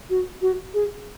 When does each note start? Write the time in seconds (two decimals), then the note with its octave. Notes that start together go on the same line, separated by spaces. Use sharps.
0.10 F#4
0.42 F#4
0.74 G#4